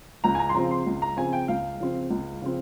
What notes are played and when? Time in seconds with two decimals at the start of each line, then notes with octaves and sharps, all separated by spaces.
0.24 C#2 A#5
0.35 G#5
0.39 A#5
0.49 C6
0.54 C#3 F3 C4 A#5
0.71 C6
0.86 C#2
1.02 A#5
1.17 C#3 F3 C4 G#5
1.33 G5
1.48 C#2 F5
1.80 C#3 F3 C4
2.11 C#2
2.42 C#3 F3 C4